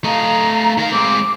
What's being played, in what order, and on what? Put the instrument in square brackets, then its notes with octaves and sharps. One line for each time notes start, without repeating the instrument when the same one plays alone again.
[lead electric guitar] A3 D#5 [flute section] F5 A#5
[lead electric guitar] D#3 A#4 [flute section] F5
[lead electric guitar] G#3 C4 [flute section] D6